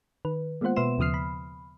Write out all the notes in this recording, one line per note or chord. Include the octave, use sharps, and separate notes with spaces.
D#3 B4
G#3 A#3 B3 F4 C5 F#5
B2 B3 B4 E5 C6 E7
D#2 C#3 F3 D#6 F6 C7
B5